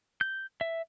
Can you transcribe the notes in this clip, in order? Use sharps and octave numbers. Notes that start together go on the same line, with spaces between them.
G6
E5